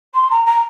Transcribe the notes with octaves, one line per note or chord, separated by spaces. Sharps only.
C6
A#5
A#5